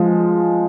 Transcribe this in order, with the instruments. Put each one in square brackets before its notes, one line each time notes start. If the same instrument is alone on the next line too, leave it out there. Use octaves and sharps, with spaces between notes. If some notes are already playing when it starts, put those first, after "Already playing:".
Already playing: [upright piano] F3 G#3